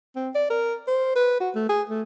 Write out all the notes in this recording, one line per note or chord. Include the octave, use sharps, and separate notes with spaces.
C4
D5
A#4
C5
B4
F#4
A3
G#4
A3